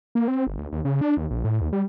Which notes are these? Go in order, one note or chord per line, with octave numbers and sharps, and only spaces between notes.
A#3
C4
G1
D2
D#2
C#3
D4
D#2
A#1
A2
D#2
G3